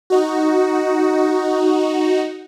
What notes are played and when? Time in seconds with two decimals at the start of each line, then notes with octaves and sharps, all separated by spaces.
0.10 D#4 F#4